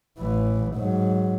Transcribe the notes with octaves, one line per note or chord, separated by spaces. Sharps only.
A1 E3
G#2 F#3